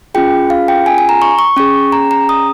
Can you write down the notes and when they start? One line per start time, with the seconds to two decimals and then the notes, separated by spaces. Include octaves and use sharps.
0.14 C#4 F4 G#4 G5
0.50 F5
0.68 G5
0.86 G#5
0.98 G#5
1.09 A#5
1.22 C#6
1.39 C#6
1.56 C#4 G#4 C#6
1.92 A#5
2.11 A#5
2.29 D#6